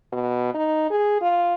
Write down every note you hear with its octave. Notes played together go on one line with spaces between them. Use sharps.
B2
D#4
G#4
F4